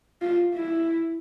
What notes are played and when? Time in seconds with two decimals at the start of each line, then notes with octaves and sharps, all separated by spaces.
0.22 F4
0.54 E4